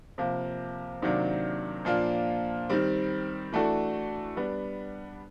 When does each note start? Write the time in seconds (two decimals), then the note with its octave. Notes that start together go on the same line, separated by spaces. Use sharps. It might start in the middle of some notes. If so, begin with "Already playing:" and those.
0.18 C3 F3 A#3
1.02 C3 D#3 F#3 A#3 D4
1.85 A#2 F3 A#3 D4 F4
2.69 D#3 G3 C4
3.53 E3 A3 D4 F#4 A4
4.37 G3 B3 D4